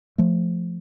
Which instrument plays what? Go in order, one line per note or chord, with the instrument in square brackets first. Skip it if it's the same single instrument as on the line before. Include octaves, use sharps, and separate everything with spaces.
[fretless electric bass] F3 A3